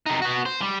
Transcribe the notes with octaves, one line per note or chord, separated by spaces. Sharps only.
C3 D#4
B3 F#4
C5
G3